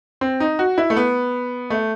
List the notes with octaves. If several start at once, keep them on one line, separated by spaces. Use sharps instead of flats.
C4
D#4
F#4
E4
A3
B3
A3